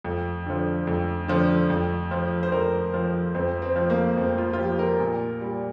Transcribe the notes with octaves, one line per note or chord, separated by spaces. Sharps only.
F2
D3 F3
F2
D3 F3
F2
F3
C5
F2 A#4
F3
F2 C4
C4
F3
A#3
F2 C4
F4
F4
F3 G4
A#4
A#2
G3